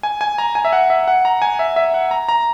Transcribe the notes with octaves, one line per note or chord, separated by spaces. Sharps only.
G#5
G#5
A#5
G#5
E5
F#5
E5
F#5
A#5
G#5
E5
E5
F#5
A#5
A#5